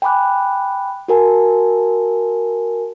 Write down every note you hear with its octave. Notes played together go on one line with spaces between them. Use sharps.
G5 G#5 B5 D6 F#6
F#4 A#4 G#5 A5